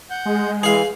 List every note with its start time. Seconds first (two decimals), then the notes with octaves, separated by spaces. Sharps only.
0.10 F#5 G6
0.25 G#3
0.63 E3 G#4 F5